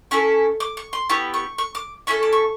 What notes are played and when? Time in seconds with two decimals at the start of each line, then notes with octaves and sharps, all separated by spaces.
0.11 C#4 E4 A4 C#6
0.60 D6
0.77 C#6
0.93 C6
1.09 B3 E4 G4 C#6
1.34 C#6
1.58 C#6
1.75 D6
2.07 C#4 E4 A4 C#6
2.23 D6
2.33 C#6